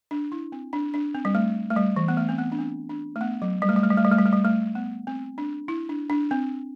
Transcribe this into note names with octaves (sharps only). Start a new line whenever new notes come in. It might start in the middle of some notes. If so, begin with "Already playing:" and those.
D4
E4
C4
D4
D4
C4
G3
A3
A3
G3
E3
B3
A3
C4
B3
D4
C4
D4
A3
B3
F#3
G3
A3
G3
A3
G3
A3
G3
A3
G3
A3
G3
A3
B3
C4
D4
E4
D4
D4
C4